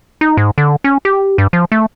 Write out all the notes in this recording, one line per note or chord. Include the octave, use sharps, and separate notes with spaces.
D#4
G#2
D3
C#4
G4
G2
F3
A3